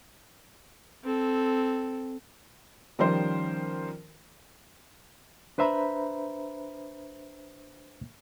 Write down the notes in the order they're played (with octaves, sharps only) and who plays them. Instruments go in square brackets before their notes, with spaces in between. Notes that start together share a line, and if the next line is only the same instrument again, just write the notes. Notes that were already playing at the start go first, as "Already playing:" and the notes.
[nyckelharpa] C4 A4
[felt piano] D#3 F3 G3 C#4 A#4 C5
[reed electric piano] D4 B4 C5 E5 A#5 B5